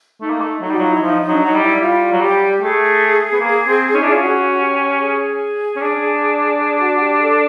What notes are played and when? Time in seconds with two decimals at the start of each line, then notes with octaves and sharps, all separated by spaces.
0.21 A3 D#4
0.30 A#3
0.41 A3
0.61 F#3 D#4
0.70 G3 F#4
0.78 F#3 F4
0.91 E4
1.01 F3 D#4
1.21 D#4
1.28 F#3 D4
1.41 D#4
1.46 F#3
1.54 G3
1.61 E4
1.80 G3 F4
2.12 F#3
2.21 G3 G4
2.61 A3 G#4
3.33 B3
3.40 A#3
3.67 C4
3.93 C#4 D#4
4.02 D4 E4
4.11 C#4 F4
4.21 F#4
4.60 G4
5.01 G#4
5.76 C#4
5.81 D4
6.60 G#4
6.81 F#4
7.01 G4
7.21 A4